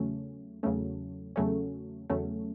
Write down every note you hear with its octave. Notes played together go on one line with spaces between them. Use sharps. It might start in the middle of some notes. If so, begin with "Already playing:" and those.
Already playing: E2 C#3 F#3 A3 C#4
E2 C#3 F#3 A3 C#4
E2 C#3 F#3 A3 C#4
E2 C#3 F#3 A3 C#4